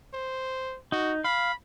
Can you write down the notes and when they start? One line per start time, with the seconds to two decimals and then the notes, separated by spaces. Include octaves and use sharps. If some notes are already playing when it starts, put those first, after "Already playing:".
0.14 C5
0.92 D#4 F#4
1.24 F5 B5